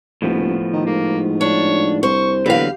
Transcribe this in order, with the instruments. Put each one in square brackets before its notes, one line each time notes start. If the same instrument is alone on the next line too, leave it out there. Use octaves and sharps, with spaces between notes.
[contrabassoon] D#1 [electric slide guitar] A2 F3 B3
[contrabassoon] D#3
[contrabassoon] G#2 [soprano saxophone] A#3
[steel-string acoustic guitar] D4 [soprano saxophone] C#5
[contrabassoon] C2 [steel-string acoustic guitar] C5 [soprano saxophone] C#6
[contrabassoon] E2 [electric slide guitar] D3 F#3 A#3 [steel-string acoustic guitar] G4 F5 [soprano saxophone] B4